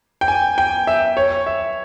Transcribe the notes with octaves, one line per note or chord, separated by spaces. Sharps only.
G5
G#5
G5
E5
C#5
E5